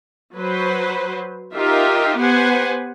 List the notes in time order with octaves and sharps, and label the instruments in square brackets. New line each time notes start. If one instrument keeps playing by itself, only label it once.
[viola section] F#3 B4 C5
D#4 F4 G4 A#4 E5
B3 G4 B4 C5 F#5 G#5